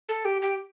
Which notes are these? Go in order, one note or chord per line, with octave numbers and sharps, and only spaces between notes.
A4
G4
G4